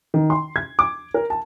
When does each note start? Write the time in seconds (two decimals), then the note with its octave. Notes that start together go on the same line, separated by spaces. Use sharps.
0.14 D#3
0.30 C6
0.56 G#6
0.79 D6
1.14 A#4
1.30 A5